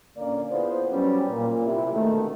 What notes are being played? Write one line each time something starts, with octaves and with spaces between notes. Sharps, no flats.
A#2 D3 A#3 C#4 D5
B3 E4 F4 G#4 B4 C5
F#3 G3 B3 C#4
A#2
C3 E4
B2 D3 D#3 G#3 A3